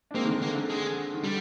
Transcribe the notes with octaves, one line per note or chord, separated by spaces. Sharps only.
D4
G#3 A#3 C4
D#3
D3
D3 A#3
D3
G#3
D#3
D3 G3